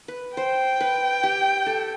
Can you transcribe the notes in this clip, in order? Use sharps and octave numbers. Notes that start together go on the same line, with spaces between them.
B4
C5 G5
B4
G4
A4